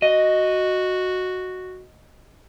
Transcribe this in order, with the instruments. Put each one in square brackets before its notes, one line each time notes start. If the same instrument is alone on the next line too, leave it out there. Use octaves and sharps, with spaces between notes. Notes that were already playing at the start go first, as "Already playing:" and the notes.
[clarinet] F#4 [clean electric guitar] D#5